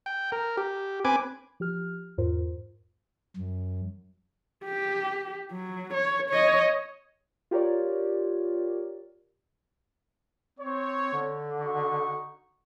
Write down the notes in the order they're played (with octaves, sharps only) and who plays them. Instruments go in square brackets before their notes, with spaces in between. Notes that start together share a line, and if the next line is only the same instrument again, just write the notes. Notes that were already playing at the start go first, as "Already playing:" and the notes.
[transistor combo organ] G5
A#4
G4
C4 B4 G#5 D6
[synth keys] F3 G4 F6
E2 G#2 F4 A#4 C5
[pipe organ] F#2
[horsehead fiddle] G4
F#3
C#5
C#5 D#5
[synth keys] F4 G4 A#4 C#5 D5
[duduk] C4 [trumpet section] C#5
[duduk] D3
[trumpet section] D#4 F#4 C#6